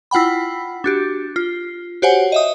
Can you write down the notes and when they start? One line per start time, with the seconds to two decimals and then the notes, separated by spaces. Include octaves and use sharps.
0.11 E4 F4 F#5 G5 B5
0.84 D4 F#4 G4
1.36 F4
2.02 F#4 G4 C5 C#5 F#5 G#5
2.32 D#5 E5 D#6